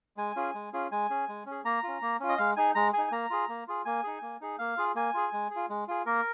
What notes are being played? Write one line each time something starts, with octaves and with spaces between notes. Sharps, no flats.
G#3 G#5
C#4 F4 G#4
G#3
C#4 F4 G#4
G#3 G#5
C#4 G#4
G#3
C#4
G#4
A#3 A#5
C#4 F4
A#3
C#4 F4
D#5
G#3 F5
D#4 G#4 G#5
G#3 A#5
D#4 G#4 G#5
G#5
A#3 A#5
F4 G#4
A#3
F4 G#4
A#3 G#5
D#4 G#4
A#3
D#4 G#4
A#3 F5
F4 G#4
A#3 G#5
F4 G#4
G#3
G#4
F4
G#3
F4 G#4
A#3 A#4